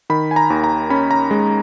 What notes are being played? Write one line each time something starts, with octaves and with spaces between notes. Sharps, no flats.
D#3 B5
G#5
A#5
D#2
A#5
C#4 B5
A#5
G#3